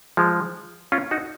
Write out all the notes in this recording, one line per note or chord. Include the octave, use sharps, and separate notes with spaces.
F3 G#3
C#4 F4
D#4 F#4